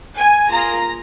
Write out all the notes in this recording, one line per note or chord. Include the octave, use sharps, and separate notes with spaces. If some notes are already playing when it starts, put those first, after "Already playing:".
G#5
A#3 F4 G#4 A#5